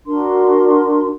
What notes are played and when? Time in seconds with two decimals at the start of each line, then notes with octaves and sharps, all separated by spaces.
0.07 D4 F#4 A#4 C6